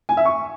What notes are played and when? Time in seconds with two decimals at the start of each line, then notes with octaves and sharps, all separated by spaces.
0.09 G#5
0.17 E5
0.25 C#6